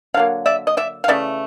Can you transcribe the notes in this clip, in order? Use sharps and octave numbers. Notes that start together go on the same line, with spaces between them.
D3 F#3 A#3 F5
D5 E5
D#5
D5 E5
F5
C#3 E3 A3 D5 E5